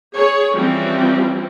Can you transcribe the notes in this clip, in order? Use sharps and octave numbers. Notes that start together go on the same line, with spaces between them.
G#4 C#5
E3 F3 G3 C4 C#4